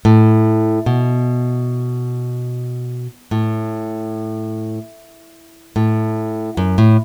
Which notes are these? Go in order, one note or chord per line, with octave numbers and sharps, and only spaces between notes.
A2
B2
A2
A2
F#2
A2